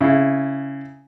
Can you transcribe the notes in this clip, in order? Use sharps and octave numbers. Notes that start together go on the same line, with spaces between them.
C#3 E4